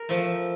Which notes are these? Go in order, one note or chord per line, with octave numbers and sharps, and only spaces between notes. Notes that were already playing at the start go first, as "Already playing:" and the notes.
Already playing: A#4
F3 A3